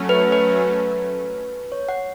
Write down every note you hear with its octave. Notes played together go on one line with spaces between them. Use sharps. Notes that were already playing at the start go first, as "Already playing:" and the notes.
Already playing: F#3 A3 C#4
B4
B4
C#5
F#5